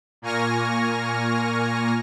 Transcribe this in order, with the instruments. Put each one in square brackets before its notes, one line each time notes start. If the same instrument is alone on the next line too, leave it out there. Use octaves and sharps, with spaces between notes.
[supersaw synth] A#2 A#3 G#5 C#6 F6 A#6